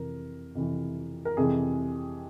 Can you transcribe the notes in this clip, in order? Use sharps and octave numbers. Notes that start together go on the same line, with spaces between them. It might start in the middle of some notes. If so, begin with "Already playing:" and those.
Already playing: F2 C3 E3 A#4
F2 C3 E3
A#4
F2 C3 E3 G#4